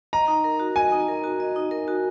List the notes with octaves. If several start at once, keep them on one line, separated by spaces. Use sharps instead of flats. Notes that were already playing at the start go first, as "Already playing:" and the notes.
D#5 A#5
D#4
A#4
F#4
D#5 G#5
D#4
A#4
F#4
D#5
D#4
A#4
F#4